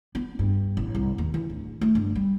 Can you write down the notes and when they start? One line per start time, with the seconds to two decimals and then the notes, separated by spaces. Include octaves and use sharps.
0.15 B3
0.39 G2
0.77 A1
0.95 C2
1.18 D#2
1.34 E3
1.50 D1
1.81 A3
1.95 G1
2.15 G3